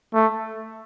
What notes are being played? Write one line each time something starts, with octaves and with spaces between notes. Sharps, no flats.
A3